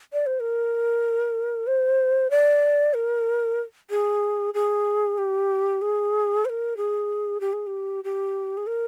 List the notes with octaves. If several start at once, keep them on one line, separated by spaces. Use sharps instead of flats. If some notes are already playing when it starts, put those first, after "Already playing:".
D5
C5
A#4
C5
D5
A#4
G#4
G#4
G4
G#4
C5
A#4
G#4
G4
G#4
G4
G4
G#4
A#4